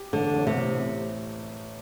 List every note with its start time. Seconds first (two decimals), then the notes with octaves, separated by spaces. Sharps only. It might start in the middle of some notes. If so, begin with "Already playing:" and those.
Already playing: G4
0.13 A1 D3
0.36 A1
0.47 C3
0.58 A2